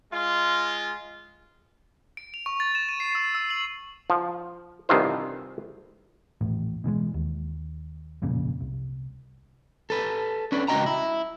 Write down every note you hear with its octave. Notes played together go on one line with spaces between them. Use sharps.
G#3 F4
D7
F7
C#6
A6
E7
D#7
C7
E6
E6
F#7
F3
C2 G2 D#3 E3 F4 C5
D#1 A1 A2
B2 E3 G3 G#3
D#2
B1 F2 A#2 C#3
C2
A4 B4
C#4 D4 B4
C#2 A3 F#4 D#5 G5 A#5
E4